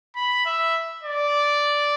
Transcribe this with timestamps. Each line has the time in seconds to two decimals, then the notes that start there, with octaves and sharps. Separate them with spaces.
0.16 B5
0.46 E5
1.03 D5